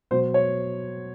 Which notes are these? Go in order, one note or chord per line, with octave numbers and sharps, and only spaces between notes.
B2 F#3 C5
C#5